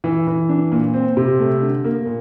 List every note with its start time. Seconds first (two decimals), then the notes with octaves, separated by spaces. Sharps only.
0.04 E3
0.27 E3
0.49 D4
0.72 A#2
0.94 C4
1.17 C3
1.39 A3
1.62 D3
1.84 A#3
2.06 A#2